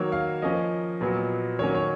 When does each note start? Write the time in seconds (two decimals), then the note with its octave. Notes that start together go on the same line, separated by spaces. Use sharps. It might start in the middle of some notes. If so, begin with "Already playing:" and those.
Already playing: D#3 F#3 A#3 C#5
0.12 F5
0.42 F3 A#3 C#4 D#5
1.01 A#2 F#3 B3
1.59 D#3 F#3 A#3 C#4 C#5
1.75 C#5